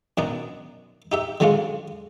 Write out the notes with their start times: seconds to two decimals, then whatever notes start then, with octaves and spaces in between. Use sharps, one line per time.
0.17 F#2 B2 D4 D#4
1.12 D#4 G4 E5
1.40 D3 F#3 G#3 C#4 D4 F4